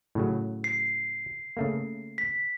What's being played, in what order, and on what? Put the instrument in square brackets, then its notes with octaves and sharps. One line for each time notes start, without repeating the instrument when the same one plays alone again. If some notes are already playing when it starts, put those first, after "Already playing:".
[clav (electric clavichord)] A2 C#3 F#3
[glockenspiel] C7
[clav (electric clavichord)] C#3 A3 A#3
[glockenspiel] B6